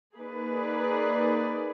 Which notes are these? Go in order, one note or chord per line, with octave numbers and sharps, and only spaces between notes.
A#3 D#4 G#4 B4 D5